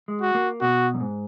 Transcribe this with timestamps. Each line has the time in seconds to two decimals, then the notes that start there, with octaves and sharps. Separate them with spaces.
0.08 G#3
0.22 F#4
0.34 A#3
0.61 B2 F#4
0.94 F#2
1.00 G#2